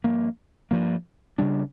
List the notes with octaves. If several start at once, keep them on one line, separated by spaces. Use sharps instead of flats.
G2 F3 A#3
G2 F3 A#3
C#3 G3 D4